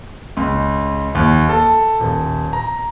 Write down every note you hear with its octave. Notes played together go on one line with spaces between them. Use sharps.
C#2
D#2
A4
D#1
A#5